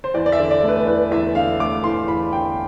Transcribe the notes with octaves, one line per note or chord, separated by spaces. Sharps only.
C5
E2 D5
D5
E5
D3
D5
A3
B4
E2 B4
E2 E5
D3 F5
A3 D6
E2 C6
E2 B5
D3 G5